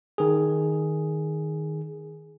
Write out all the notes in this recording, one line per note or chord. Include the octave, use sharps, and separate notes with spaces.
D#3 G#4